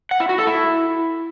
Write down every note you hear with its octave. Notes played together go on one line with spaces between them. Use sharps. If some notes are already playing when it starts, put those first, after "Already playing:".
F#5
E4
F#4
A4
E4